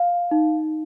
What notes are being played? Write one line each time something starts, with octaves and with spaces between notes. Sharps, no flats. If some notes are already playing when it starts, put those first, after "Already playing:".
Already playing: F5
D#4